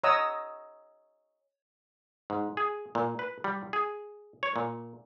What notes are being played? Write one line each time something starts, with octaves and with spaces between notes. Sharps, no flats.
C#5 D#5 F#5 A#5 D#6 E6
G#2
G#4
A#2
B4
G3
G#4
C#5
A#2